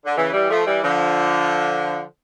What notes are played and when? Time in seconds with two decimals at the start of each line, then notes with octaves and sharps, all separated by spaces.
0.05 D3
0.17 C#3 E3
0.33 E3 G3
0.50 F3 A3
0.66 E3 G3
0.83 D3 F3